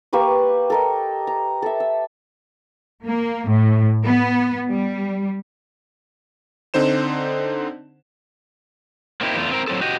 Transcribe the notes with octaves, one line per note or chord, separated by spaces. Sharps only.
A#3 G4 B4 C#6
A4 A#4 D#5
A#5
A4 E5
E6
A#3
A2
B3
G3
D3 C4 D#4 C5 E7
A#3 C4 D#4 E4 G4
E2 A3 F4
C4 A#4
F#3 C4 A4
F#4 G4 D#5